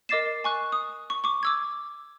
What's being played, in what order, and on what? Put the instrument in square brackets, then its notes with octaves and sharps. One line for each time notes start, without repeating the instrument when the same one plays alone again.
[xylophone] A#4 D#5 D6 A6 C7 E7
G#5 C#6 F#6
D#6
C#6
C#6 D6
D6 E6 G#6